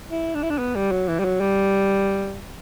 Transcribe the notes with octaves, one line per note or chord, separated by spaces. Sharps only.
E4
D4
E4
D4
B3
G3
F#3
E3
G3
F#3
G3